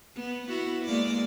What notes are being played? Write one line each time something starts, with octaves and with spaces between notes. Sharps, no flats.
B3
B3 E4 F#4
G#3 A#3 D5